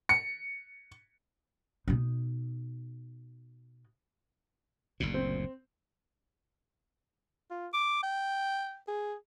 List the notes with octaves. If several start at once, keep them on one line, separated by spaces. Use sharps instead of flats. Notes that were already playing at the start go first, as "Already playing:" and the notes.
C#7
B2 D#4
F#1 D2 A#2
C4
F4
D6
G5
G#4